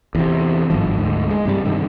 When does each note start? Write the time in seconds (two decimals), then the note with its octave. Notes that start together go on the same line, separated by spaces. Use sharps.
0.15 E2 C3
0.70 G#1 G2 F3
0.97 D2 G#2
1.30 G#3
1.45 G2 C3 G3
1.65 G2 C3 D#3